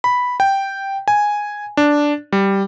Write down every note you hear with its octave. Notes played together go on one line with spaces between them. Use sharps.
B5
G5
G#5
D4
G3